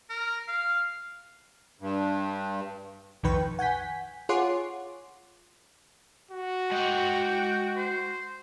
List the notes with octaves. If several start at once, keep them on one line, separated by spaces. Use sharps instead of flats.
A#4
F5
G2
B1 F2 D#3 B4 G5 C#6
F#5 G#5 G6 B6
F4 G#4 C#5 F#5 C6 D6
F#4
G#3 F#5 G5
C5